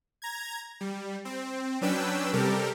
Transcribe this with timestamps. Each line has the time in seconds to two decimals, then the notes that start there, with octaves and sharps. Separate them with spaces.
0.22 A#5 G#6
0.81 G3
1.25 C4
1.81 F#3 C#4 D4 B4 G5 E6
2.33 C3 G3 G4 A4 A#4